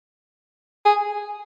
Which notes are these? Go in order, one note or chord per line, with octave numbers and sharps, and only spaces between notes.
G#4